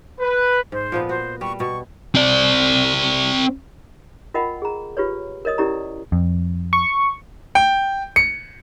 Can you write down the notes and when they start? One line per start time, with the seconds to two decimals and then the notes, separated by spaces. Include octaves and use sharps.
0.20 B4
0.72 G#2 C5
0.92 A#2 F3 B3
1.09 F#4 C5
1.41 G3 C#6
1.60 B2 C#6
2.15 C4 D5
4.34 F4 A#4 D#5 F#5 G5 B5
4.62 G#4 A#5
4.97 F4 G4 B4 C#5
5.45 A#4 C#5 D#5 D#6
5.58 C#4 E4 G4 A#4 D5 A#5
6.12 F2
6.73 C#6
7.55 G5
8.16 C#7